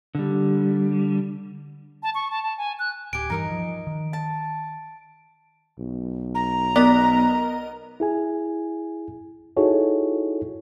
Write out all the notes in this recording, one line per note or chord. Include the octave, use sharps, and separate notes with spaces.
D3 G3
A5
C#6
A5
A5
G#5
F#6
D1 G4 G#5 D7
G2 E3 G3 D#4 A#4 D#5
F3
D#3
A5
B1
A#5
B3 A#4 D5 D#5
E4 G#4 G#5
D#4 E4 F#4 G#4 A4 C#5